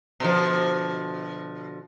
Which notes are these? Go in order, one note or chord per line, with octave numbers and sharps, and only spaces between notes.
B2 D3 F3